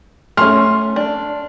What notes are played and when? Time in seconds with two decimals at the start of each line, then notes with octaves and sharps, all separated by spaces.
0.37 A3 C#4 C6 F6
0.96 D4